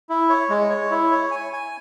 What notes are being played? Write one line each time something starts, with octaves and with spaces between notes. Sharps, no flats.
E4
C#5
G#3
C#5
E4
C#5
G#5
G#5